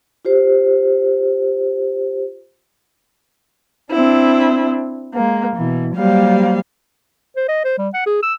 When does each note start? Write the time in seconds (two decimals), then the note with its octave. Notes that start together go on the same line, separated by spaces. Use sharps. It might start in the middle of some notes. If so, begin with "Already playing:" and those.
0.25 F4 G4 C5
3.91 C4 D4 E4
5.14 G#3 A#3
5.55 B2 E3
5.94 F#3 G3 A#3 G4 C5 F5
7.36 C5
7.48 D#5
7.64 C5
7.78 G3
7.94 F#5
8.06 G#4
8.22 E6